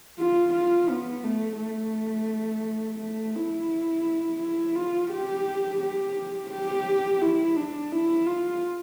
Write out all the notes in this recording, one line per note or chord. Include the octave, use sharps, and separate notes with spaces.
F4
F4
B3
A3
A3
A3
E4
E4
F4
G4
G4
G4
E4
D4
E4
F4